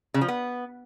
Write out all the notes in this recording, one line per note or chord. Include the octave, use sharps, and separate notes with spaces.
C#3
F3
B3